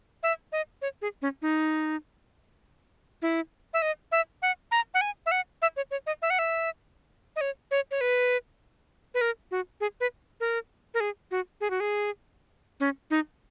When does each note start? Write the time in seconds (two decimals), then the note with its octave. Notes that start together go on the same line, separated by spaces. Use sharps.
0.23 E5
0.52 D#5
0.82 C#5
1.02 G#4
1.22 C#4
1.42 D#4
3.22 E4
3.74 E5
3.82 D#5
4.12 E5
4.42 F#5
4.71 A#5
4.94 F#5
5.01 G#5
5.26 E5
5.31 F#5
5.62 E5
5.77 C#5
5.91 C#5
6.07 D#5
6.22 E5
6.30 F#5
6.39 E5
7.36 D#5
7.41 C#5
7.71 C#5
7.91 C#5
8.01 B4
9.14 B4
9.21 A#4
9.51 F#4
9.81 G#4
10.00 B4
10.40 A#4
10.94 A#4
11.00 G#4
11.31 F#4
11.61 G#4
11.70 F#4
11.80 G#4
12.80 C#4
13.10 D#4